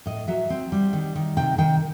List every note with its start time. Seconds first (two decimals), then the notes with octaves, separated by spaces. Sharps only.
0.06 A2 D#5
0.28 F#3 E5
0.50 C4
0.72 G3
0.93 D#3
1.16 D#3
1.37 C3 G5
1.58 D#3 G5